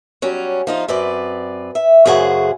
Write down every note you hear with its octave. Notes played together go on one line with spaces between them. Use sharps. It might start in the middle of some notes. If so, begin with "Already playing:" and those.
F#3 G3 C#4
F3 D#4 F4
F#2 C4 B4 D5
E5
F#2 C#3 A3 G#4 C5 F#5